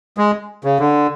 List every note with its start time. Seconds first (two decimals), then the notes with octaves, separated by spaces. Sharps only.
0.18 G#3
0.64 C#3
0.80 D3